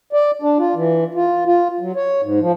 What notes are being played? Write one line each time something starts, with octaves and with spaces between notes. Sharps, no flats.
D5
D4
F4
E3
F4
F4
F#3
C#5
G#2
F3